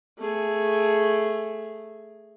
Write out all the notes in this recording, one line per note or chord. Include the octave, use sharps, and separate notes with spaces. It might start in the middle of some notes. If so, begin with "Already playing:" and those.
A3 G#4